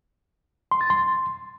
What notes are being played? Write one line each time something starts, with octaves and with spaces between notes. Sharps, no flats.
C6
A6
C6